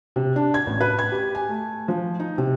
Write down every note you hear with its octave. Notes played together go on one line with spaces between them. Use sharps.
C3
D4
G#6
A1
B4
G#6
G4
G#5
A3
F3
D#4
C3